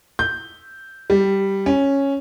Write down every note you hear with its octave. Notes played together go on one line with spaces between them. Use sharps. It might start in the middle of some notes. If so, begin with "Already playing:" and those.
G6
G3
C#4